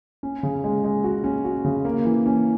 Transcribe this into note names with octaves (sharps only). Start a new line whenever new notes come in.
C#4
C#3
G#3
G#3
F#4
C#4
F#4
C#3
A#3
E3
C#4